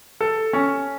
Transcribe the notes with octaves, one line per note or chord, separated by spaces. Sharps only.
A4
C#4